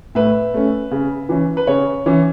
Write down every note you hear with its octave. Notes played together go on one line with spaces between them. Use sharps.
A2 B4 E5
A3 C#4
C#3
E3 C#4
B4
C#3 C#5
E3 C#4